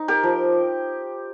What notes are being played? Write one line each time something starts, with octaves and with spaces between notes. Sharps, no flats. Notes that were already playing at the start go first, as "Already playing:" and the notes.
Already playing: D#4
G4 A#4
F3